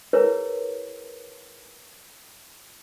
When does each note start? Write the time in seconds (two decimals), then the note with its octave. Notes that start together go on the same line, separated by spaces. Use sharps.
0.13 E4 G#4 A#4 B4 C#5